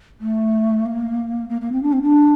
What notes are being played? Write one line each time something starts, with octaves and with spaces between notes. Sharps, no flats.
A3
A#3
A#3
A#3
C4
D4
C4
D4